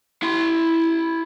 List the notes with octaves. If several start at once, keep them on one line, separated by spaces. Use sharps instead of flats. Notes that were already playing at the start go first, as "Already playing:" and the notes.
E4 C6